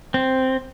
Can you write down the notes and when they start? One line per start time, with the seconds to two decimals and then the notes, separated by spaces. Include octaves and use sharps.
0.14 C4